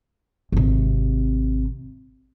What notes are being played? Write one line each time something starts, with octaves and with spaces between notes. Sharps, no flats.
G#1 C3